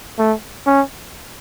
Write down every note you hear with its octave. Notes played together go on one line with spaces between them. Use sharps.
A3
C#4